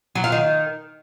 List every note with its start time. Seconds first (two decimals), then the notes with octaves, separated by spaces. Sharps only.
0.15 F#3
0.24 F4
0.32 D#3